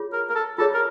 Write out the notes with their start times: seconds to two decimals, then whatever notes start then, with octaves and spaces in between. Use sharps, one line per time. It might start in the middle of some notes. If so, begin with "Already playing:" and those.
Already playing: F4 G#4 C#5
0.13 A#4
0.30 A#4
0.36 A4
0.58 F4 G#4 A4 C#5
0.74 A#4